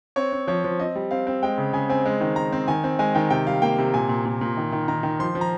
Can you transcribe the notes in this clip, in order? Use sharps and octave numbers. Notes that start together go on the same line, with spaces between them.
C4 C#5
C4
F3 C#5
F3
C4 D#5
G3
C4 F5
C4
G#3 G5
C#3
C#3 G#5
C4 G#5
G#3
D#3
G#3 A#5
C4
D#3 G#5
C4
G#3 G#5
D#3 G5
C3 G5
G3 F5
A#3 G5
C3
A#2 G#5
A#2
A#2
A#2
D#3
D#3
D#3 A#5
D#3
F3 C6
F3
A#5